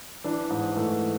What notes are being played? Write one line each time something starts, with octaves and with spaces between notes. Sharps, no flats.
E3 D4
G#2
E3 A3